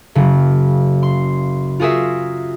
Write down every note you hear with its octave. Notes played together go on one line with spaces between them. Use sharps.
F#1 C#3
C6
F4 F#4 G#4 A#4 E5